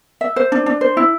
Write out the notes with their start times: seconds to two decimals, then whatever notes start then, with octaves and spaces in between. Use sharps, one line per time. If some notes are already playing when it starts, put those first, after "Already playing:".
0.21 E5
0.36 C5
0.52 D4
0.66 D4
0.81 C5
0.97 E4